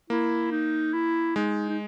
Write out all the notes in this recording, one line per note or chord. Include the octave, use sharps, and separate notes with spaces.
A#3 E4
D#4
E4
G#3 D#4
D#4